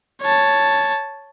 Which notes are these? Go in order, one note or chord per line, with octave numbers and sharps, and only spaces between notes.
C#5 A5